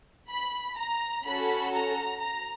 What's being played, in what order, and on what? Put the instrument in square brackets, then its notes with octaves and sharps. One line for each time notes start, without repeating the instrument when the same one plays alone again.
[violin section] B5
A#5
C#4 F#4 A4 B5
A#5
A#5